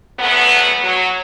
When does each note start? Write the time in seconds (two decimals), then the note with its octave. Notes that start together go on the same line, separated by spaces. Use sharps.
0.19 E2 F#3 A3 B3
0.84 F#3